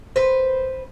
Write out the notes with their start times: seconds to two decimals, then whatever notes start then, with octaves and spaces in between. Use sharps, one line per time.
0.16 B4 C5